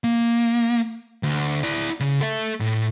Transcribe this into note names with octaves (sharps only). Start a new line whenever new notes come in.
A#3
D2
E4 D5
C#3
A4 E5
A2